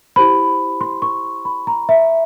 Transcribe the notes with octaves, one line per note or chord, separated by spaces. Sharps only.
E4 G4 C5 B5
C6
C#6
B5
A#5
E5